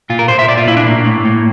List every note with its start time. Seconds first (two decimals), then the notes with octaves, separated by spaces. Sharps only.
0.10 A#2 F4
0.19 A#4
0.28 A#2 C5
0.39 E5
0.48 A#2 D5
0.57 F4
0.67 A#2 E4
0.77 D4
0.86 A2 A#3
1.05 A2
1.25 A2